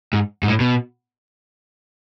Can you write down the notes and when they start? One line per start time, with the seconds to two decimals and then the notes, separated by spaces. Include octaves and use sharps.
0.13 G#2
0.43 G#2
0.48 A2
0.60 B2